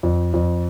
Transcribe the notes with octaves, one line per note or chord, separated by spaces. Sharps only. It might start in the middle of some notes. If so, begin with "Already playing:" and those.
F2
F2